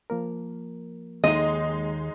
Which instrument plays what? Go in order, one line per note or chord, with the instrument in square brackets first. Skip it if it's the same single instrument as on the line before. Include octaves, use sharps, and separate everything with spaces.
[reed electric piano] F3 A#3 A#4
[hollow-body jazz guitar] D#2 [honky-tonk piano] G#3 D#4 [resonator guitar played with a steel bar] D#5